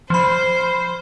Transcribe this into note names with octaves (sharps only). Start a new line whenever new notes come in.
F3 C5 B5